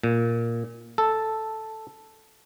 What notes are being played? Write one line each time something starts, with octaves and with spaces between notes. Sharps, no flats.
A#2
A4